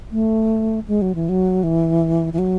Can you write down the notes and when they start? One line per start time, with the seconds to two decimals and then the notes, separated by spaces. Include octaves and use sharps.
0.11 A3
0.88 G#3
1.02 F#3
1.15 E3
1.29 F#3
1.63 E3
2.33 E3
2.39 F#3